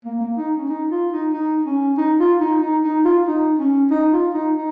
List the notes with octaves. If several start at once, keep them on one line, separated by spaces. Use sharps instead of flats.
A#3
A#3
D#4
C#4
D#4
F4
D#4
D#4
C#4
D#4
F4
D#4
D#4
D#4
F4
D#4
C#4
D#4
F4
D#4
D#4